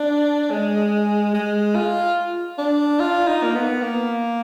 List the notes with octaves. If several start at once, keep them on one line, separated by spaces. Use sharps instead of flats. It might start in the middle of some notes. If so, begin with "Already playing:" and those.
Already playing: D4
G#3
G#3
F4
D4
F4
D#4
A#3
B3
A#3